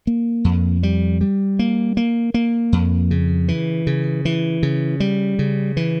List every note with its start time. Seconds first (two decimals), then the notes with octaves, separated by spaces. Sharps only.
0.07 A#3
0.44 F2
0.83 G3
1.21 G3
1.59 A#3
1.97 A#3
2.34 A#3
2.73 F2
3.11 C#3
3.48 E3
3.87 C#3
4.25 E3
4.63 C#3
5.00 G3
5.39 C#3
5.77 E3